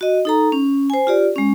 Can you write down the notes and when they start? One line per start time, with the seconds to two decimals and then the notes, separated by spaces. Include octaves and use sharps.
0.01 F#4 D#5
0.25 D#4 A4 A#5
0.52 C#4
0.90 C5 G#5
1.07 F4 G4 D5
1.36 G#3 C#4